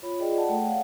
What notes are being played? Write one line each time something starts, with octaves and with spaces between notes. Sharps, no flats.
F4 C#5 B5
F4 G#4 D5 D#5 G5
D5 F#5 A5
A3 A4 F#5 G5
C#5 F5 F#5